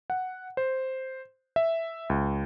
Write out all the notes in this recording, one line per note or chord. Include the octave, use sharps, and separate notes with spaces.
F#5
C5
E5
C#2